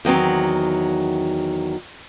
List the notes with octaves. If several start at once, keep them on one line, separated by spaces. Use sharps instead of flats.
E2 D#3 F#3 C4